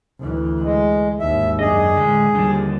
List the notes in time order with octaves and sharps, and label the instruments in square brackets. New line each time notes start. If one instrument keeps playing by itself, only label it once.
[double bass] D2 E3
[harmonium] G#3
[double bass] G#1 D#2 [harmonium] E5
[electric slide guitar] F#2 D#5 [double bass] D4 [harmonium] G#4
[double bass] A2 [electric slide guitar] D3 G#3
[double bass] D#2 G3 [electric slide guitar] D3 F3 D4